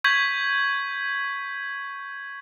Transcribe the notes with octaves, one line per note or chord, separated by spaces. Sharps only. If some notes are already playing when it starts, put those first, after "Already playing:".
C#6 G6 G#6 B6 F#7